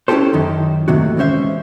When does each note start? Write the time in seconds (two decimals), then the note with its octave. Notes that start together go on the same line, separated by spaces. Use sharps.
0.08 C#4 E4 F4 G4 A4 C5
0.33 F#2 D#3
0.88 D#2 A2 C3 F#4
1.17 E3 G#3 C#4 C5 E5